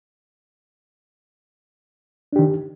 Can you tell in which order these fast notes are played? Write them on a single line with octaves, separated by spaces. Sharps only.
D4 G4 D#3